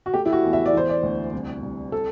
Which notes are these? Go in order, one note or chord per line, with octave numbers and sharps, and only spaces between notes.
F#4
A3 G4
E4
F#4
E2
E5
D5
E3 C5
D5
D2
C2
C2
A4